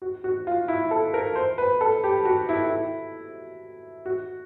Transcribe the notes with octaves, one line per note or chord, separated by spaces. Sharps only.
F#4
F#4
F4
E4
A4
A#4
C5
B4
A4
G4
F#4
E4
E4
F#4